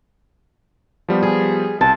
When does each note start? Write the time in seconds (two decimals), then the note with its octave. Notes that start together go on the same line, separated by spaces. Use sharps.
1.09 F3 G3 B3
1.23 G#4
1.81 C2 A5